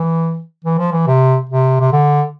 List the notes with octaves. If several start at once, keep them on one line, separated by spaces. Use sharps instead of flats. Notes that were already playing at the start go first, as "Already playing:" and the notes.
Already playing: E3
E3
F3
E3
C3
C3
C3
D3